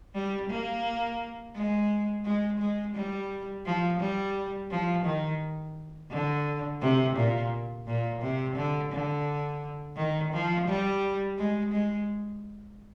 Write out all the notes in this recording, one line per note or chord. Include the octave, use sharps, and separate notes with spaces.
G3
A#3
G#3
G#3
G#3
G3
F3
G3
F3
D#3
D3
C3
A#2
A#2
C3
D3
D3
D#3
F3
G3
G#3
G#3